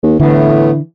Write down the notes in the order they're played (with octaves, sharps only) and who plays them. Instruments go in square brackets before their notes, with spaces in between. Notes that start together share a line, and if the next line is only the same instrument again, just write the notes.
[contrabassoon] D#2
[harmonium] A2 A3 B3 [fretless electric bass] D3 [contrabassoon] E3